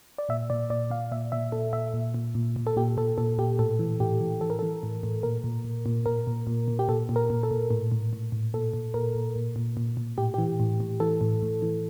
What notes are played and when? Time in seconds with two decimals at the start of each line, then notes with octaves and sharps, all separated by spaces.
0.18 D5
0.29 A#2 E5
0.50 A#2 D5
0.70 A#2 D5
0.90 A#2 F5
1.11 A#2 E5
1.32 A#2 E5
1.52 A#2 A4
1.73 A#2 E5
1.94 A#2
2.14 A#2
2.35 A#2
2.56 A#2
2.67 A4
2.77 A#2 G4
2.97 A#2 A4
3.18 A#2 A4
3.38 A#2 G4
3.59 A2 A4
3.79 E3
4.00 A2 G4
4.20 E3
4.41 E3 A4
4.50 A#4
4.59 E3 A4
4.83 A2
5.03 A2
5.23 A#2 A#4
5.44 A#2
5.65 A#2
5.86 A#2
6.06 A#2 A#4
6.27 A#2
6.47 A#2
6.68 A#2
6.79 G4
6.88 A#2 A4
7.09 A#2
7.16 A#4
7.30 A#2
7.43 A4
7.51 A#2
7.70 A2
7.92 A2
8.13 A2
8.32 A2
8.54 A#2 A4
8.73 A#2
8.94 A#2 A#4
9.15 A#2
9.36 A#2
9.56 A#2
9.77 A#2
9.97 A#2
10.18 A2 G4
10.34 E3 G4
10.60 A2
10.80 A2
11.00 E3 A4
11.21 A2
11.42 A2
11.62 E3